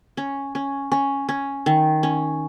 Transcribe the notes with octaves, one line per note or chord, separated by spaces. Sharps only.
C#4
C#4
C#4
C#4
D#3
C#4